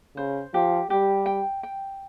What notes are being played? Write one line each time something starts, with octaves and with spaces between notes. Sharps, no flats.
C#3 C5
F3 G4
G3 G4
G5
G5